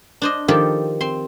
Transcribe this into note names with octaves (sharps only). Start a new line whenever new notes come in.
D4 C5 D#5
D#3 F3 D#4 G4 A4
C4 C6